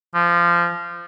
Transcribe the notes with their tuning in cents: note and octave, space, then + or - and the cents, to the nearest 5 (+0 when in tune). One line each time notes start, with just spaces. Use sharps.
F3 -20